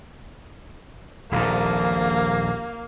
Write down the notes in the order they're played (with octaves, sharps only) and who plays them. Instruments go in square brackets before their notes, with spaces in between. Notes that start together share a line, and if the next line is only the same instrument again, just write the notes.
[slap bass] D#1 A#1 G#2 [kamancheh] A#3